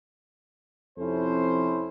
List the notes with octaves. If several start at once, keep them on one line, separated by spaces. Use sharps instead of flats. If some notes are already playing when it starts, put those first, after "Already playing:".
F2 C3 C#4 E4 A4 C5